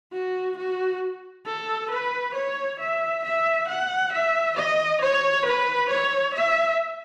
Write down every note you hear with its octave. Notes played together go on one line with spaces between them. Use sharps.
F#4
F#4
A4
B4
C#5
E5
E5
F#5
E5
D#5
C#5
B4
C#5
E5